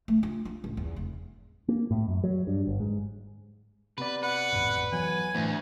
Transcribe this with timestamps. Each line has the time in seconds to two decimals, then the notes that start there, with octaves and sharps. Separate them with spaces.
0.08 A3
0.23 F4
0.45 F4
0.64 A1
0.77 E2
0.96 F1
1.68 A#3
1.91 A2
2.08 F#2
2.24 F#3
2.47 G2
2.67 G1
2.80 G#2
3.98 C3 B3 B4 D5
4.23 B4 F#5
4.52 G#1 F2 A2
4.92 E3 F#3 B3 G#5
5.35 D2 A2 E3 A3 B3 C5